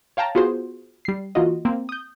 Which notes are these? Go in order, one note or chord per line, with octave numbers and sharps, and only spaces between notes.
C#5 F5 G5 A5 A#5
B3 F4 F#4 G#4 C5
G3 C7
E3 A#3 F4 F#4 D#5
A#3 C4
D#6 G6